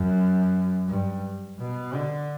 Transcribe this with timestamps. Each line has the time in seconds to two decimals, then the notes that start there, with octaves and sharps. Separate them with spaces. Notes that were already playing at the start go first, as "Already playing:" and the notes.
Already playing: F#2
0.89 G2
1.60 B2
1.94 D3